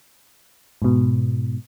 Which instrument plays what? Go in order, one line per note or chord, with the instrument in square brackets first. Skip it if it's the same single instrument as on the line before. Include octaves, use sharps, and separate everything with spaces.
[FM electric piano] G#2 B2